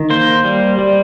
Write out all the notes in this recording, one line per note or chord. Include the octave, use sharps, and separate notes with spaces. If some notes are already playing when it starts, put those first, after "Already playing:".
Already playing: D#3
A#3 C5
G3
G3